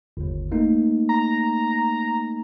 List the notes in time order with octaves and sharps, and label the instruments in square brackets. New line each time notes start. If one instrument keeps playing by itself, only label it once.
[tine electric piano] G1 D#2
A3 A#3 D#4
[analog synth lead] A#5